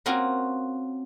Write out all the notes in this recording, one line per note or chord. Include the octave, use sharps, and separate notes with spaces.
A#3 C4 C#4 F4 F#4 A#4